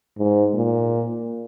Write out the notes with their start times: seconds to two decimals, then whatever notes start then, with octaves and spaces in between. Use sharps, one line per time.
0.19 G#2
0.54 A#2